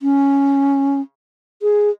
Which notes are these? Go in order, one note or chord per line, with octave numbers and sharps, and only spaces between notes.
C#4
G#4